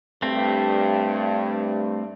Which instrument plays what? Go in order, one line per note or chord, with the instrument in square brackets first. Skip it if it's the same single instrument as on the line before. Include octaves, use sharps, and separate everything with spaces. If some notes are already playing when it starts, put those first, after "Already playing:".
[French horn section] G2 [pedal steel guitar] A3 C4